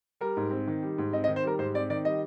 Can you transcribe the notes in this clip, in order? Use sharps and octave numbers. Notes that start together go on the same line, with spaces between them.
G3 A#4
G#2
C4
D#3
G3
G#2
C4 D#5
D#5
D#3
C5
G3 A#4
G#2 C5
C4 D5
D#3 D5
G3 D#5